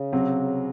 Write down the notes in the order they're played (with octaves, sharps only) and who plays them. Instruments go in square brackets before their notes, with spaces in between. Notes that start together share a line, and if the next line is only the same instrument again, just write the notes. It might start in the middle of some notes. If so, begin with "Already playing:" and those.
Already playing: [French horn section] C#3
[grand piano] C3 F#3 C4